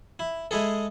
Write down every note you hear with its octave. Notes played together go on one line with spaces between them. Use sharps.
E4
G#3 E4 G#4 A4